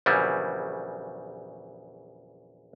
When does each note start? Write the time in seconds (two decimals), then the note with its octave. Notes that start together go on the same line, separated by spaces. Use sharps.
0.06 A#1 E2 C#3 F#3 G3